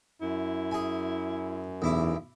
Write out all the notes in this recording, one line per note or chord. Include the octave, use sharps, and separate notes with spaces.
F#2 E4
G#4 G#5
B1 E2 E4 D6